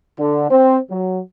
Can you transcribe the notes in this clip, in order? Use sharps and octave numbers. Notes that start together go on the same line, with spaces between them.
D3
C4
F#3